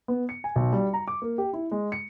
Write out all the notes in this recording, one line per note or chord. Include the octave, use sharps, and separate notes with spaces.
B3
C#7
G#5
B1
G3
A#5
D6
A#3
G4
E4
G#3
C#7